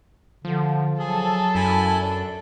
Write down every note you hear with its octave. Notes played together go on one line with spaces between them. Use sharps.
D3 F3
F#3 G#4 A4
F#2 E4 G#5
D4